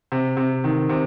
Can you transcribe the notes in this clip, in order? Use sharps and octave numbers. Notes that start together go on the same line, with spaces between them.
C3
C3
D#3
C3